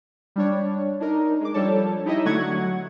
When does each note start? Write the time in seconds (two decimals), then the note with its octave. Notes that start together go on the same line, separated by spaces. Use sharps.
0.36 G3 D4 C#5
1.00 D4 D#4 A#4
1.41 G#3 D6
1.54 F3 G3 D4 A4 C#5 A5
2.06 D#4 E4 G4 C#5 D#5 E5
2.25 D3 F#3 A3 F#5 C#6 G#6